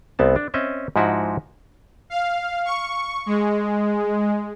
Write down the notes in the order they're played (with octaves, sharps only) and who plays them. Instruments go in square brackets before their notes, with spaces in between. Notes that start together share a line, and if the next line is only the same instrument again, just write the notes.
[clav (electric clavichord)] C2 B3 C4 A5
D4
C4 C#4 D#5 E5
G#2 F3 D#4 E4 F#4 F#5
[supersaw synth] F5
C#6
G#3